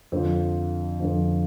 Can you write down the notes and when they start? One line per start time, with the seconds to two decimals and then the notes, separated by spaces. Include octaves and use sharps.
0.12 F2 D3 F3 C5
1.00 F2 D3 F3